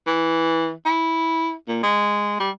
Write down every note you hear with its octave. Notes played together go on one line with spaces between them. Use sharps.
E3
E4
A#2
G#3
G3